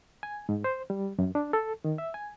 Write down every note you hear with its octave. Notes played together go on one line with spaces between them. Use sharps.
G#5
G#2
C5
G3
F#2
D4
A4
D#3
E5
G#5